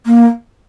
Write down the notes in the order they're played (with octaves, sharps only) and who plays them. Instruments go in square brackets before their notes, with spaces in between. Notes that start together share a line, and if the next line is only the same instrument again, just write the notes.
[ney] A#3